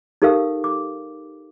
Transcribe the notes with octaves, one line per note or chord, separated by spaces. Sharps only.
D#4 G4 A4 A#4 F5 E6
D6